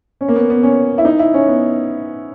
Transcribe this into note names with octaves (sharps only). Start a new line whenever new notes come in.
C#4
A#3
B3
B3
C#4
E4
D#4
E4
C#4
B3